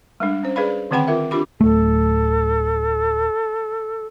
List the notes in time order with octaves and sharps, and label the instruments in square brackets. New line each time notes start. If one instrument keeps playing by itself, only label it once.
[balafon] G3 G#3 D4
C#4 C5
G#4 B4 D5 F5 B5
D3 D#3 C4 F#5 G5 B5
F4 A#4 E5
D4 F4 G4 B5 D6
[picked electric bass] D1 A3 [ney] A4